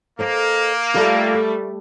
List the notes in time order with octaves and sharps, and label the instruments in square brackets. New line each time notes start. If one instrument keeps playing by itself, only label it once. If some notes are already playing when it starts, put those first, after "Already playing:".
[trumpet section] A#3 [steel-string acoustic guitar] A4 C5 D#5
[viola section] G3 A3 [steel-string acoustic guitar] F4 A4 F5
[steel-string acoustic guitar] D5